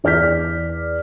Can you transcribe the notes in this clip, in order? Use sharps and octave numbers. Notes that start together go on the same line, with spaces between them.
E2 D5 F6 G6 B6